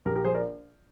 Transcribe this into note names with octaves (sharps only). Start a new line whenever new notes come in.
A#1 G4 A#4
G4 A#4
F3 G#4 C5
A#4 D5